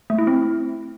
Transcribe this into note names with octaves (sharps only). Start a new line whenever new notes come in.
A3
E4
C4